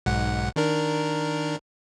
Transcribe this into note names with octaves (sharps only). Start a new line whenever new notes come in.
B1 G#2 F#5
D#3 D4 A#4